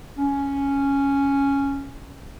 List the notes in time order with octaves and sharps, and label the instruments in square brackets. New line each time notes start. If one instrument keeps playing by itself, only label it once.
[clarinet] C#4